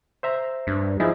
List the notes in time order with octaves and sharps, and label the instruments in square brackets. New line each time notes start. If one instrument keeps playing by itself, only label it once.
[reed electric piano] C5 E5 A#5
[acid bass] G2
[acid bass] F3 [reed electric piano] D#4 E4 G#4